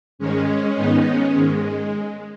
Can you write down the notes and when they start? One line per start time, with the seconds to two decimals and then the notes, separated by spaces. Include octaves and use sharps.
0.19 G#2 D#3 G#3 C#4
0.76 G#2 D#3 B3 D#4
1.05 G#3 C#4
1.33 G#2 D#3 G#3